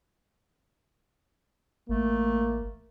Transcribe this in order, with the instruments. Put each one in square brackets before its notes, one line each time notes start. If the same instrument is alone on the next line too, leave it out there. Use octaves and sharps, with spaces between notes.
[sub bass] A1 [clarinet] A3 [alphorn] A#3